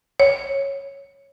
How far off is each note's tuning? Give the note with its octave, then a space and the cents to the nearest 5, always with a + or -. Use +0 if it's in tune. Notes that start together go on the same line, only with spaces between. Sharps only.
C#5 -5